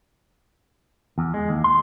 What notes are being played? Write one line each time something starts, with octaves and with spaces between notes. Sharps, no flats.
E2
G#3
D#2
C6